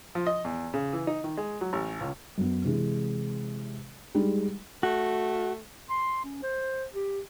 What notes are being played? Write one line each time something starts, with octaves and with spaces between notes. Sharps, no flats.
F3
D#5
E2
C#3
E3
D#4
D#3
G#3
F#3
A1
C#2
F#2 B3
C3 E3 G#3
G3 G#3 D#4
A3 F#4
C6
C#4
C5
G4